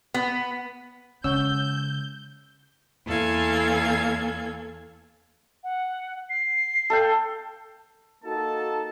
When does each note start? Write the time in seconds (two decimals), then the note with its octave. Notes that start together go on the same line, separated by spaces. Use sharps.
0.14 B3
1.24 C#3 G#3 C#4 C#5 F#5 E6 G6
3.06 E2 A#3 A4 F5 G#5 G#6
5.64 F#5
6.30 C7
6.90 A4 F5 G5
8.24 A#3 D#4 F#4 A4 A5